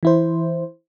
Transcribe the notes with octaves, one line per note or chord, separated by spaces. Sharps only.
E3 E4 C5